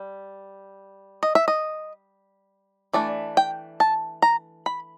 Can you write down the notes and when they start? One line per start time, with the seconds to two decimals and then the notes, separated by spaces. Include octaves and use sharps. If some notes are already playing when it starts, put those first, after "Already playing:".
Already playing: G3
1.23 D#5
1.35 E5
1.48 D#5
2.93 E3 A3 D4 D5
3.37 G5
3.80 A5
4.22 A#5
4.66 B5